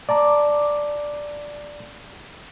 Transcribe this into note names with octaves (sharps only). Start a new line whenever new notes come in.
D5 A5 A#5 D6